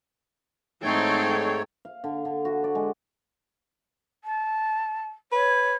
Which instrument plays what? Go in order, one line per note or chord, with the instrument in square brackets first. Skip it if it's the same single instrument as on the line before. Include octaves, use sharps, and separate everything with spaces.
[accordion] G#2 A3 C#5 [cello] C4 D#4 [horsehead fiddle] A4 G5
[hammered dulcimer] F5
D3
D3
F#4
D5
G#3
[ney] A5
[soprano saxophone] B4 [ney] C#5